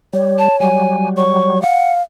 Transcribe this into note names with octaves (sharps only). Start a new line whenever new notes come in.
G3 C#5
A5
F#3 G3 G#5
C#5 C#6
F5 F#5